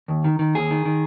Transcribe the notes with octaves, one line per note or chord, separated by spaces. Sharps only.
D#2
D#3
D#3
D#2 G#4
D#3
D#3